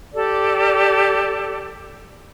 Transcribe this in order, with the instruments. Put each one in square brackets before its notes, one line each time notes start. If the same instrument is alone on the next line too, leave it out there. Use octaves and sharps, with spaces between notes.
[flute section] G4 A4 D5